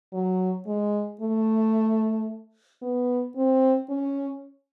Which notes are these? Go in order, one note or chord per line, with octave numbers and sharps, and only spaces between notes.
F#3
G#3
A3
B3
C4
C#4